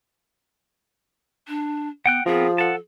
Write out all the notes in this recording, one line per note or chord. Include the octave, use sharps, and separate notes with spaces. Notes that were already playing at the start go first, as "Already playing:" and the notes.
D4
B3 F#5 G5 F#6
F3 B3 C4 G#4 A#4
A4 F#5 A5